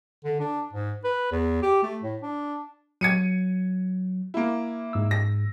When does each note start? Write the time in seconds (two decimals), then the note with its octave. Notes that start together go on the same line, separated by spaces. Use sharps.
0.24 D3
0.40 D4
0.73 G#2
1.04 B4
1.31 E2
1.62 G4
1.83 A3
2.02 A2
2.22 D4
3.01 F#3 G#6 C#7 D#7
4.34 A#3 E4
4.93 G#2 E6
5.11 A#6